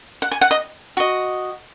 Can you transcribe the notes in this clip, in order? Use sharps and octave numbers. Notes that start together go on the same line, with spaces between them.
F#5
G#5
F#5
D#5
F#4 D#5